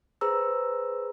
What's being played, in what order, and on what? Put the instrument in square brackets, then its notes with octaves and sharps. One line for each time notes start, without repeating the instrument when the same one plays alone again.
[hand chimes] G#4 B4 C5 A#5 E6